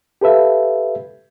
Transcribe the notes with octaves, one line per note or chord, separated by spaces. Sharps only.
G4 A4 B4 E5 F5